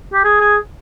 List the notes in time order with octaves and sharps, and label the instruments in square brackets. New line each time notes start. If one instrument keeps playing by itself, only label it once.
[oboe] G4
G#4
G#4